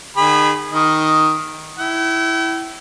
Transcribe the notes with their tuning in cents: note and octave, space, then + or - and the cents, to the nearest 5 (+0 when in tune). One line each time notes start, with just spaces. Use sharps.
D#3 -35 G#4 -30 B5 +0
D#3 +5 D#5 +0
E4 +0 G5 -40